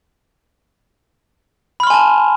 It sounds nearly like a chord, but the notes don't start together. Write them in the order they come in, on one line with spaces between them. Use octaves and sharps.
B5 F6 C6 G#5 A5